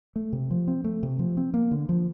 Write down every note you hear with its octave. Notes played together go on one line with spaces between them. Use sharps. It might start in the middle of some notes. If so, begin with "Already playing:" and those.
A3
C3
F3
C4
A3
C3
F3
C4
A#3
D3
F3